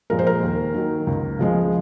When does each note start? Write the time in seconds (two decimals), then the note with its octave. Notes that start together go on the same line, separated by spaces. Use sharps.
0.10 A#2 F3 G#3 A#4
0.19 C5
0.27 A#4
0.43 D#2
0.74 D#3 F#3
1.07 C#2
1.39 C#3 F3 G#3